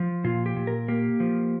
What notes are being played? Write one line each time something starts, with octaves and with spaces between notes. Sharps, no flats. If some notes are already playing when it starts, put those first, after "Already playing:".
Already playing: F3
A#2 F4
G4
A#2
A#4
A#3 G4
F3